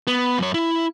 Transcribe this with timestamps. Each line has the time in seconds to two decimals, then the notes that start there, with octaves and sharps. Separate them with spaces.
0.07 B3
0.39 F#2 C#5
0.54 E4